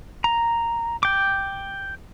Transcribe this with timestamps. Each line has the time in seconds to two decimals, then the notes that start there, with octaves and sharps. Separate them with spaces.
0.24 A#5
1.03 G5 D6